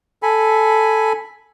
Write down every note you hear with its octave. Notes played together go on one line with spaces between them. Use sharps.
A4 G#5 B5